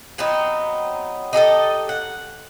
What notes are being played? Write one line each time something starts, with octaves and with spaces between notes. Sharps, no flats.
F#3 B3 C4 D#4
D#4 G4 A4 D#5
F#5